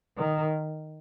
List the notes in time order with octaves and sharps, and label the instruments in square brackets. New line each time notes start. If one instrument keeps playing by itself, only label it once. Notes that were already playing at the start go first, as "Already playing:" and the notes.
[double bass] D#3